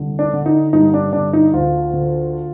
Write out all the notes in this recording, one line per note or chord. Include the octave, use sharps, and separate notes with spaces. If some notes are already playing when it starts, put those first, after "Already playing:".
Already playing: C2 D3
D4
D3
D#4
G2 D#4
D4
D3 D4
D#4
D2 F4
D3